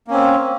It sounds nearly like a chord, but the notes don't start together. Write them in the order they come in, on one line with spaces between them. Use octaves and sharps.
A#3 C#4 C4